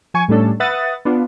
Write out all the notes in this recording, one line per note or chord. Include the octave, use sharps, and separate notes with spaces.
F3 G#5 C#6
A2 G3 A3 C#4 D4 A4
B4 E5 F#5 D#6 A6
B3 D4 F4